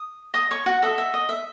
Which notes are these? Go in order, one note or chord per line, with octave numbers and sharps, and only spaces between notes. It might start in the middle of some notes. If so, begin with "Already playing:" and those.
Already playing: D#6
D#5 D#6
C#5 C#6
F#4 F#5
F#4 A4 D#5 E5
E5
D#5
E5